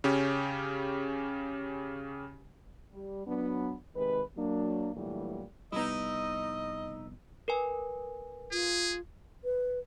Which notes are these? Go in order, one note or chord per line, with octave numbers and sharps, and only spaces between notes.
C#3 C#4 G4
G3
F#3 B3 D4
C3 D#3 G#3 B4
F#3 A#3 D4
G2 A#2 E3 F#3 G3 A3
F1 G3 B3 D#4 E4 D#5
A#4 B4 G#5
F4 G#4
B4